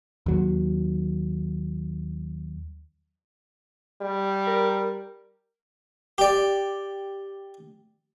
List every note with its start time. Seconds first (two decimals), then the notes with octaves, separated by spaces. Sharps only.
0.26 D#2 F#3
4.01 G3
4.47 A#4
6.18 G4 D5